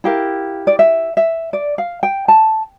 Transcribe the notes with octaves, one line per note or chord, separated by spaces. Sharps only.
E4 G4 A#4 F5
D5
E5
E5
D5
F5
G5
A5